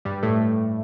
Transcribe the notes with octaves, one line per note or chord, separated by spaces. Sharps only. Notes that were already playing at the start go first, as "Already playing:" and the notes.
G2 G3
A2 A3